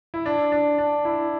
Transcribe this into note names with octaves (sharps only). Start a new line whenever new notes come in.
E4
D4
D4
D4
E4